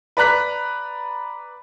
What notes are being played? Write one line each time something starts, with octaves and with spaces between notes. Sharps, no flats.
B4 D5 A#5 F#6 B6